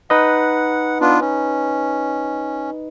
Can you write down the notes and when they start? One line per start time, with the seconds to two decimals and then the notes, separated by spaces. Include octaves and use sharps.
0.10 D#4 B4 D#5 F#5
1.01 B3 D4 F4
1.21 C#4